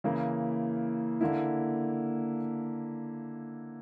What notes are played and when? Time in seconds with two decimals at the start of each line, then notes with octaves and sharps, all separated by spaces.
0.04 C#3 E3 A#3 E4
1.21 D3 A#3 E4